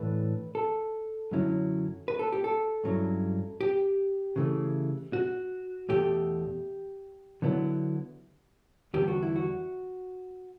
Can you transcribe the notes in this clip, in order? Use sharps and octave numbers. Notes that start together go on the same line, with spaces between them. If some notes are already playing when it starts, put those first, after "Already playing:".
Already playing: A2 E3 A3 D4 B4
A4
F#2 D3 F#3 C#4 E4
B4
A4
G4
A4
G2 F#3 C#4 E4
G4
C#3 E3 A3
F#4
E2 B2 A3 G4
D3 F#3 B3 E4
E2 D3 G3 B3 G4
F#4
E4
F#4